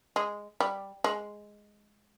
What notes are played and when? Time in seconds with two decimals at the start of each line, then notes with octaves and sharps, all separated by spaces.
0.16 G#3
0.60 G3
1.04 G#3